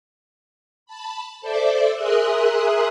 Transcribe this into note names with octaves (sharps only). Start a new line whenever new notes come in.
A5 B5
A4 C5 D5 E5 D6
G#4 A#4 E5 C6 D#6 F#6